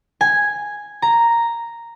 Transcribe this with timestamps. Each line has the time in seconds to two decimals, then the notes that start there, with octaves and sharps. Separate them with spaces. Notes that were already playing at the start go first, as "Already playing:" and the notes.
0.21 G#5
1.02 A#5